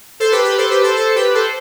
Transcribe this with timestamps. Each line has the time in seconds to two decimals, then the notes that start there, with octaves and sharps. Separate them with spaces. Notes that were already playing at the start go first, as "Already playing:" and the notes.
0.20 A4 C5
0.32 G4 B4
0.45 G4 B4
0.58 A4 C5
0.71 G4 B4
0.83 A4 C5
0.96 A4 C5
1.16 G4 B4
1.34 A4 C5